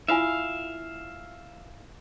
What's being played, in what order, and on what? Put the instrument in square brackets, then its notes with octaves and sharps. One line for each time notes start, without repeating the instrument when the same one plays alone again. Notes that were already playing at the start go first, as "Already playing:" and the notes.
[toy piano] E4 F4 G#5 [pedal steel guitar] E5 F5